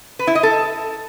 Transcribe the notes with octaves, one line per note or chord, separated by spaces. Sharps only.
B4
E4
D#5
A4